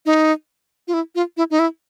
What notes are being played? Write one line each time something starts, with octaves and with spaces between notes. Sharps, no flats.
D#4
F4
E4
F4
E4
D#4
E4